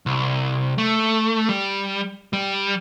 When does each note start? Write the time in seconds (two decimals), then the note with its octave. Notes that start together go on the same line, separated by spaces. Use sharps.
0.06 C2
0.78 A3
1.49 G3
2.33 G3